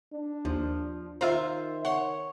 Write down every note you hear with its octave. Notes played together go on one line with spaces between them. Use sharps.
D4
D#2 F3
D#3 F4 C5 E5 F5 A#5
C#5 F#5 C6